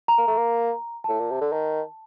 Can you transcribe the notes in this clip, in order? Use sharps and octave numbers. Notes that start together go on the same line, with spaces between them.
A#5
A#3
A3
A#3
A2 A5
A#2
C3
D3
D#3